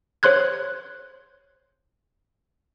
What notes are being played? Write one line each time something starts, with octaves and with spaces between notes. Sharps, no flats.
C5 C#5 C6 F#6 G#6